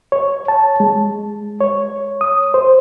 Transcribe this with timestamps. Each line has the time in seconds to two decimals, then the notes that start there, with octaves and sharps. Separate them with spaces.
0.12 C#5
0.48 A5
0.80 G#3
1.61 C#5
2.21 D#6
2.54 C5